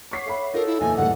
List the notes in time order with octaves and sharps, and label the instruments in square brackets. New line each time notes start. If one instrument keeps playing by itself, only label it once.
[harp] C#5 F#5 D6 [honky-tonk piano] C#6 B6 C7
[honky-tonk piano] A4 E5 B5
[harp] D#4 [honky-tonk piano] F4 [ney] A4 [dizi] A#4
[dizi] E4
[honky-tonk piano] F#1 [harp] E2 A#2 D#4 [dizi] G#5
[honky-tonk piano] A1 D2 G3 [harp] G#2 A#3 [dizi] F#5